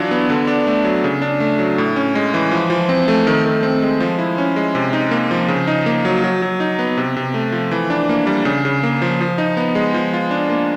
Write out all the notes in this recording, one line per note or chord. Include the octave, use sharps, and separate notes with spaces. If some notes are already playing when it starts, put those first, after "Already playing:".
Already playing: E3 F#3 D4 F4
B3
D3
D4
A3
F#3
C#3
D4
A3
F#3
A2
C#4
G#3
E3
F3
F3
C4
A3
D#3
D#3
C4
G#3
F3
E4
C#4
G#3
C3
D#4
A#3
F3
C#3
D#4
A#3
F#3
F#3
F#3
D#4
B3
C3
C3
A3
F3
E3
D4
A#3
G3
C#3
C#3
A#3
F3
F3
D#4
B3
G#3
F3
F4
D4
A#3